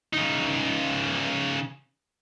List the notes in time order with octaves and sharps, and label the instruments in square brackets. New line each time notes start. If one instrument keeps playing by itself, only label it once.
[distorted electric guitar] C#3 D#4